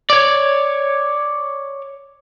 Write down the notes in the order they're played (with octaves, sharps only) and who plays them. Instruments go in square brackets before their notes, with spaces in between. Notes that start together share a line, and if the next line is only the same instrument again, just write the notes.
[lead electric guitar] C#5 D5